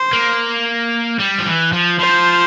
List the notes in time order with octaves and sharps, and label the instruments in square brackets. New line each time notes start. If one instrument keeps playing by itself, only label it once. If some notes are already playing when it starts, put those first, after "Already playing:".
Already playing: [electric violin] C5
[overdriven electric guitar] A#3
G3
F3
E3
F3
[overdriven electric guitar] F3 [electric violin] C5